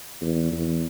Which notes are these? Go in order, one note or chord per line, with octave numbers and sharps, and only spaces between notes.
E2
E2